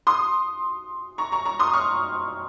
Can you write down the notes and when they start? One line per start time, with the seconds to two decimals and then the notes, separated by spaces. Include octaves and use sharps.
0.07 C6 D#6
1.18 A#5 C#6
1.32 A#5 C#6
1.45 A#5 C#6
1.59 C6 D#6
1.74 C#6 F6